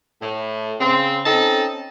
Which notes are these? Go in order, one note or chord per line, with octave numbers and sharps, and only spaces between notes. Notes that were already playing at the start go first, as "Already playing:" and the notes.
A2
C#3 C4
C4 C#4 D#4 A4 A5